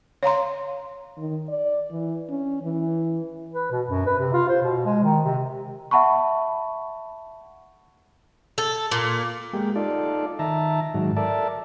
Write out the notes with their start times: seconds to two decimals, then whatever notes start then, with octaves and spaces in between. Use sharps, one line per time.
0.23 C#5 F5 A#5 C6
1.17 D#3
1.49 D5
1.91 E3
2.30 C#4
2.62 E3
3.54 B4
3.72 B2
3.87 F#2
4.06 B4
4.19 C3
4.33 F4
4.49 C5
4.62 B2
4.85 G#3
5.03 D#3
5.25 C3
5.91 E5 F#5 A5 B5 C#6
8.58 A4
8.91 A#2
9.53 G#3 A#3 G4
9.76 D#4 F4 A4 D5
10.39 D#3 E5 A5 A#5
10.94 G#2 D#3 F#3
11.16 A4 A#4 D5 E5 A5